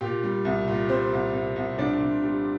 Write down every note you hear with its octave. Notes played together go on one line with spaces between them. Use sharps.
A#2 G4
G3
C2
A#2
G3 C4 C5
C2
C2
C2
C2 D4 D5
C2
G3